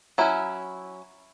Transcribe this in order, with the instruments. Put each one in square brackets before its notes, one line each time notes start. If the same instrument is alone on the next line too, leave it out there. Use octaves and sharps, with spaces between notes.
[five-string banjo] F#3 C#4 E4